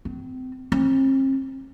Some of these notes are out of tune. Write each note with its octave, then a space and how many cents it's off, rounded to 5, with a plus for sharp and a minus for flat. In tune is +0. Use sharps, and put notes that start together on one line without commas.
C4 -30
C4 +40